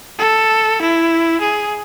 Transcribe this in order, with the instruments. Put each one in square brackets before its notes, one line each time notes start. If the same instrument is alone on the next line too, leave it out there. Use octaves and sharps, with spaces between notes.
[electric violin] A4
E4
G#4